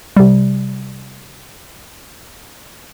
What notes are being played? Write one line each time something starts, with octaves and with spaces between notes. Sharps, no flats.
C3 G3